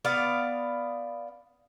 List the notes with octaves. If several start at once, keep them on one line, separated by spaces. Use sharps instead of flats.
B3 D5 F5 F#5